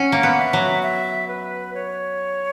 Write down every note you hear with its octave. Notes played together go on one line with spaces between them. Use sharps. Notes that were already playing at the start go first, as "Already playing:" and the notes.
Already playing: C#4 F#5
A#3
B3
E5
F#3
E5
B4
C#5